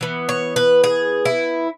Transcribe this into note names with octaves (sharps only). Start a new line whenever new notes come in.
E3 B3
C#5
B4
G#4
E4